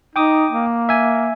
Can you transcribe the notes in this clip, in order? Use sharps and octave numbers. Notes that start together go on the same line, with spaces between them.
D#4 G5 D6 D#6
A#3
E5 G#5